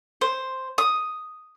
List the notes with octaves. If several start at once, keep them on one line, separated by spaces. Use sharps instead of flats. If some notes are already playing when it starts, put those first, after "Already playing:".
C5
D#6